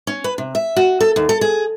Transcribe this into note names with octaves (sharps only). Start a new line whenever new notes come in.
C#4
B4
C3
E5
F#4
A4
D#2
A4
G#4